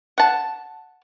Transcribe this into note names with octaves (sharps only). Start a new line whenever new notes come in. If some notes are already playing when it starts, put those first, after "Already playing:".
F#5 A5